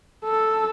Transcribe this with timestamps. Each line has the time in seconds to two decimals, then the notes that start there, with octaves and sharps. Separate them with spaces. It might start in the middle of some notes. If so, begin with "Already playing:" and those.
0.25 A4